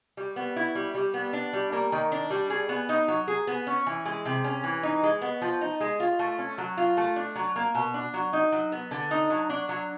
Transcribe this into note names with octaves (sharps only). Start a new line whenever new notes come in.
G3
B3
E4
G3
G3
B3
D4
G3
A#3
D#3
D4
G3
G#4
B3
D#4
F#3
G#4
B3
C#4
E3
G#3
C3
C#4
E3
D#4
G#3
B3
F3
D#4
G#3
F4
A3
C#4
F#3
F4
A3
D4
F#3
A#3
B2
D4
F#3
D#4
F#3
B3
D3
D#4
F#3
D4
F#3